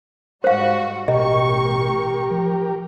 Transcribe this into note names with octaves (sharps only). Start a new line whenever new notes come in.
G#2 G3 F#4 C5 F5
A1 B2 G4 A#4 D#5 C#6
F3